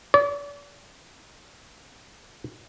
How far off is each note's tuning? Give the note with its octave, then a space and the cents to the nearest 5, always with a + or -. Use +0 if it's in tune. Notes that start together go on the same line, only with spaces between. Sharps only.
D5 -40